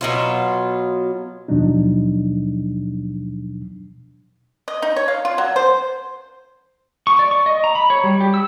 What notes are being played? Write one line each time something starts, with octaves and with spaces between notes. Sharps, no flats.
B2 F#3 F4
D#2 B2 F3 F#3 D4 D#4
D#5
D#4
C#5
F5
F4
F#3
C5
C#6
D5
C#6
D#5
A#5
B5
C#5
G3
G4
E6